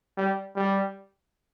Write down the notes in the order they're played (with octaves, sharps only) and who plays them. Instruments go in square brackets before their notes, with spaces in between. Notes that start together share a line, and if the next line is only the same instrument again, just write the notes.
[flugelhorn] G3
G3